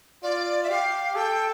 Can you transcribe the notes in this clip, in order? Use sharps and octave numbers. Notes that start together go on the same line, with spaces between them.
F4 D5
E5
G4 F5
A4 G5